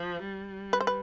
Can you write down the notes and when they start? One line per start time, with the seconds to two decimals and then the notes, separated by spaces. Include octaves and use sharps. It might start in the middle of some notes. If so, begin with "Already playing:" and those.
Already playing: F3
0.23 G3
0.73 B4
0.80 C5
0.87 B4